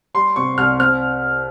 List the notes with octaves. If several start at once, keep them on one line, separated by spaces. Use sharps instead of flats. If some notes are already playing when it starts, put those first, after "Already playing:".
G3 C6
C3 C#6
C2 F6
C4 F6